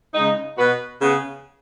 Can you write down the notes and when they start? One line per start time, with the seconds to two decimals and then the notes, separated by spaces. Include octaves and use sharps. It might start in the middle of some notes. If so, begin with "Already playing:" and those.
0.14 C#3 G#3 D#4
0.57 B2 B3 F#4 B4
1.00 C#3 B3 G#4